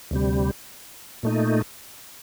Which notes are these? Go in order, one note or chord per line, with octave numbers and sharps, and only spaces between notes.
D2 C3 G3
A#2 A3 D#4